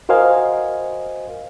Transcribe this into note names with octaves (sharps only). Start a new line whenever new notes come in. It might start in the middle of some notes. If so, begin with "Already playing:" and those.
F#4 A#4 C5 D#5 F5 G#5